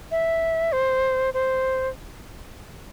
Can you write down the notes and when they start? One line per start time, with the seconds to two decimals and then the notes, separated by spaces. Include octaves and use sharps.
0.11 E5
0.72 C5
1.34 C5